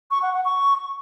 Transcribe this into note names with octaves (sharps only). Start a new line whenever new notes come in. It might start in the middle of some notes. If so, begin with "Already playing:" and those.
C#6
F#5
F#5
C#6